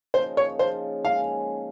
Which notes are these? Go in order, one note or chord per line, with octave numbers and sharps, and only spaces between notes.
C#3 F3 A#3 D#4 C5
C#5
C#3 F3 A#3 D#4 C5
G#3 C#4 G#4 F5